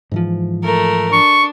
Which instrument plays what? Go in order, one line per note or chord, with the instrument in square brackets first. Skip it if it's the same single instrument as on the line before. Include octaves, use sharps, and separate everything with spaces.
[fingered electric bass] G#2 E3 F3
[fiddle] A3 A#4
[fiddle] D4 [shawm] C#6